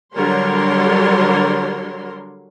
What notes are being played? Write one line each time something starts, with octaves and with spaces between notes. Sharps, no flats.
D3 F#3 G3 A#4 C#5 C6